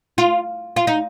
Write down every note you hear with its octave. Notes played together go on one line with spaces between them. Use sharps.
F4
F4
D#4